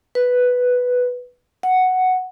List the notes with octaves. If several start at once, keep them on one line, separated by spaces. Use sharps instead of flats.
B4
F#5